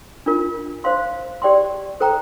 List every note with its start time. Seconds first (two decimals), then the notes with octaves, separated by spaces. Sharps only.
0.26 D4 F4 A#4
0.84 C5 F5 C6
1.42 G4 D5 G5 C6
2.00 A4 C5 G5 A#5